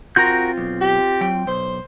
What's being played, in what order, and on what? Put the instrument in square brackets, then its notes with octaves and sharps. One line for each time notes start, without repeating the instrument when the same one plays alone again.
[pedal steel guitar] C4 F4 G6 [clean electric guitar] F#4 A#4
[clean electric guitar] B1
[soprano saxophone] G4
[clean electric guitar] F#3 G5
[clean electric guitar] B1 [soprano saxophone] C5